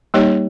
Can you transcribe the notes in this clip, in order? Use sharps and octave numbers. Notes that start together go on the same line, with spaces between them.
G3 A#3 D#4 G4 C#5